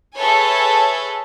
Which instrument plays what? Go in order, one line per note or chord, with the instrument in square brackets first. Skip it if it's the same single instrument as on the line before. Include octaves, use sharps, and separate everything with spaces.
[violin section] G#4 A4 B4 C#5 E5 G#5